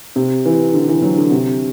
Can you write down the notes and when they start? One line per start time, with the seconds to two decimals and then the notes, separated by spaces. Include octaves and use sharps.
0.16 C3
0.45 E3
0.74 D3
0.89 E3
1.02 F#3
1.18 D3
1.31 C3